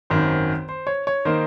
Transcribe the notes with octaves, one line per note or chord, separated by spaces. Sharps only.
G#1 F#2 D#3 C5
C5
C#5
C#5
D#3 A#3 D#4 C5